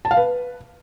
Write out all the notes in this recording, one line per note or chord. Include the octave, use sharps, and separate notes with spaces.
A5
F5
B4